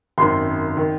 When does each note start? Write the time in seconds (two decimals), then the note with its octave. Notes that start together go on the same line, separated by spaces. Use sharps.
0.18 G#1 F#2 D#3 C6
0.77 D#3